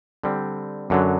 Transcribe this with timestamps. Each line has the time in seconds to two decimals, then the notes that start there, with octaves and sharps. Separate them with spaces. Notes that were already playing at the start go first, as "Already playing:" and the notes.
0.23 D3 G3 C4
0.90 F#2 D3 F#3